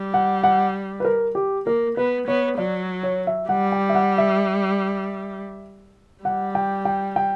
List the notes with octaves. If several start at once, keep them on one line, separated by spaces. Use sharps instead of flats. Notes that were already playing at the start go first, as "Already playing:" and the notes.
Already playing: G3
F#5
F#5
B4
A#4
G4
A#3 A#4
B3 B4
B3 C#5
F#3 D5
C#5
E5
G3 F#5
G5
E5
F#5
E5
G3 F#5
G5
G5
G5